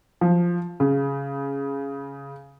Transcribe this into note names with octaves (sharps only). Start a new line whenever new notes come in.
F3
C#3